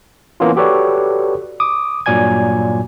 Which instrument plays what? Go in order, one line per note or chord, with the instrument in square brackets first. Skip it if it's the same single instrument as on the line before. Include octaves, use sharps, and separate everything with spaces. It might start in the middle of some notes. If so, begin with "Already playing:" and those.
[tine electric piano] E3 A#3 B3 C#4 F4
F#4 G4 A4 B4 C#5 D5
D6 D#6
G2 A#2 F#3 D5 G#5 G#6